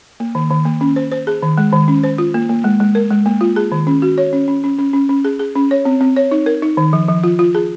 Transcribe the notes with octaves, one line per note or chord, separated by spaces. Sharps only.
A#3
D#3
D#3
A#3
C#4
C5
C5
G#4
D#3
G#3
D#3
C#4
C5
F4
A#3
A#3
G#3
G#3
A#4
G#3
A#3
F4
G#4
D#3
C#4
F#4
C#5
C#4
C#4
C#4
C#4
C#4
C#4
G#4
G#4
C#4
C#5
C4
C4
C#5
D#4
A#4
D#4
D#3
F3
F3
F4
F4
G#4